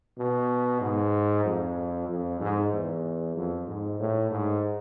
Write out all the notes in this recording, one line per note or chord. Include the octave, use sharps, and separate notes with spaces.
B2
G#2
F2
F2
G#2
E2
F2
G#2
A2
G#2